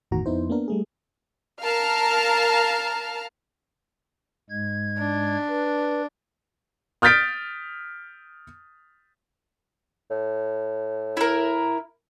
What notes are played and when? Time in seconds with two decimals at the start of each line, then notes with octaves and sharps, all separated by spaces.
0.11 G1 E2 A2 D#3 F#4 A#5
0.26 F2 B3 D#4 E4 C5
0.50 A#3 B3 D4 A#4
0.68 G3 A3 G#4
1.62 A#4 F5 A5 A#5 F6
4.50 G#2 G#3 G#6
4.99 D4
5.49 B4
7.02 D#6 F6 G6 A6 B6 D7
10.11 A2
11.17 E4 A#4